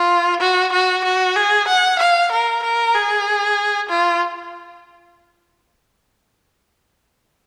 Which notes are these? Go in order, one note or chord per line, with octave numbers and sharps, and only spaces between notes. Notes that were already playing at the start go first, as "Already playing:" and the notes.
Already playing: F4
F#4
F#4
F#4
G#4
F#5
F5
A#4
A#4
G#4
F4